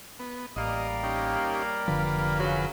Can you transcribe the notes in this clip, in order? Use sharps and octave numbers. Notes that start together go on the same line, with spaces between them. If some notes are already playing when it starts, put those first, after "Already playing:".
B3
A1 G3 A#3 D#5
C#4 D#4 G4
F1 D3 F3 F4 B4
F#2 C#3 F#3